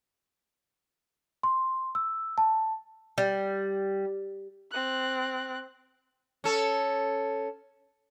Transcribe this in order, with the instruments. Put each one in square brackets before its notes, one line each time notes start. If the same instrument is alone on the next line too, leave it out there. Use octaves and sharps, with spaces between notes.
[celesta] C6
E6
A5
[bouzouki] G3
[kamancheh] C4 F#6
[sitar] C#4 A4